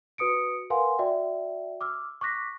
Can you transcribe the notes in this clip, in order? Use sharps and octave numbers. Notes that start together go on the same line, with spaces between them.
F#4 B4 D#6 C#7 D7
A#4 B4 F5 F#5 G#5 C6
F#4 D5 E5 G5
D6 E6 F6
C#6 D6 F#6 A#6 B6